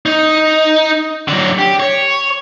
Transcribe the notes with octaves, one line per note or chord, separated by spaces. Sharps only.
D#4
D3 F#3
G4
C#5